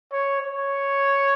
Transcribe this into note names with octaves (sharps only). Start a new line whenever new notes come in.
C#5
C#5